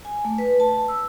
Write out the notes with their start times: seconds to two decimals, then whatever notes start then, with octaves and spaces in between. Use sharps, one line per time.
0.05 G#5
0.25 A3
0.38 B4
0.60 A5
0.88 E6